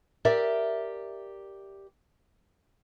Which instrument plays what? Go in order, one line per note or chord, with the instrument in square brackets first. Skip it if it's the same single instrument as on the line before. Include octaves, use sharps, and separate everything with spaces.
[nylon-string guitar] G4 A#4 D5 E5